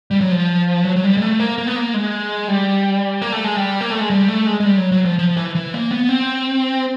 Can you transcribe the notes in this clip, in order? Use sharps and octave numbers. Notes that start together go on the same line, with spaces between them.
G3
F#3
F3
F#3
F#3
G3
G#3
A3
A#3
A#3
B3
A#3
G#3
G3
A#3
A3
G#3
G3
A#3
A3
G#3
G3
A3
G#3
G#3
G3
F#3
F#3
F3
F3
E3
E3
A#3
B3
C4